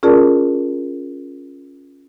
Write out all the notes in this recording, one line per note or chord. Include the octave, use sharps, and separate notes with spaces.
C#4 F4 G#4 A#4 D5 A5